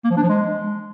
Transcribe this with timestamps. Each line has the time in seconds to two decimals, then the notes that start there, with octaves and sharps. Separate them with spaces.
0.04 A#3
0.10 F3
0.17 D4
0.23 F3
0.29 G#3